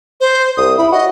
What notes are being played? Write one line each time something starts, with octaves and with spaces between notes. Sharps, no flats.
C5
C2 D#6
E4 B5
F#4 D#5